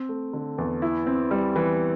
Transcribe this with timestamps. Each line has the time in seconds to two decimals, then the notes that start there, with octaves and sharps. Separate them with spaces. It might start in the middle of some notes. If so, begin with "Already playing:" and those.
Already playing: C4
0.09 A3
0.33 D3
0.58 E2
0.82 E4
1.07 C4
1.31 G3
1.56 E3